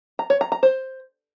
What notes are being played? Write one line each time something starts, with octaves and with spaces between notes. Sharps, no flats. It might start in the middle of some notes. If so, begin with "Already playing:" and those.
A#5
C#5
A#5
A#5
C5